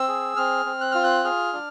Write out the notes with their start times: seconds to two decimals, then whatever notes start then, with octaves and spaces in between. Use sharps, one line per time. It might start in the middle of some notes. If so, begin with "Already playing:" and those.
Already playing: C4 E6
0.08 G#4
0.36 C4 F6
0.66 C4
0.81 F#6
0.92 F4 F6
1.04 F#6
1.24 G#4 F6
1.53 D4